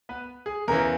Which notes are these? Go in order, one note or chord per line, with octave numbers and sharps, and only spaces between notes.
B3 B4
G#4
E2 C#3 E3 A#4
A#4